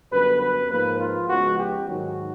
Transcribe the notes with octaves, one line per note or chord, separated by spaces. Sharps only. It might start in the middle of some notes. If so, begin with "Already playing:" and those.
F#2 D3 G3 B3 B4
B4
G#2 F3 A#3 B4
F4
C#2 C#3 F3 G#3 B3 F#4
G4
G#2 D#3 F#3 F#4